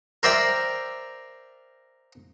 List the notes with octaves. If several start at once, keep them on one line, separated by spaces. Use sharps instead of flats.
A#4 C5 D5 E5 G5 A#5